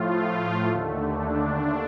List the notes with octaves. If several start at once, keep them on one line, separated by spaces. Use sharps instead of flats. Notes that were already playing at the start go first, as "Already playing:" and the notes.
Already playing: A2 F3 A3 F4
D#2 D3 A3
D4